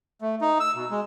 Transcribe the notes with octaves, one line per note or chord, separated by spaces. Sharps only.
A3
D#4
E6
B2
G#3